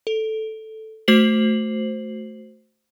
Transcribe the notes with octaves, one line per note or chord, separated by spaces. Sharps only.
A4
A3 F#4 C5 C7 F#7